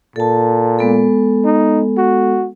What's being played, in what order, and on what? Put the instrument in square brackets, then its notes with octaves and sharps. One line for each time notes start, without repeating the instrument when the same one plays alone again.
[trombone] A#2 [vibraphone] A4 A5
[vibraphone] G#3 B3 A4
[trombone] D#4
F#4